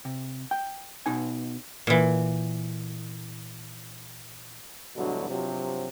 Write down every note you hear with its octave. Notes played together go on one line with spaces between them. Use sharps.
C3
G5
B2 D#4 G#5
A#2 E3
D2 G2 B2 D3 E3 F#3
G2 C3 F3 F#3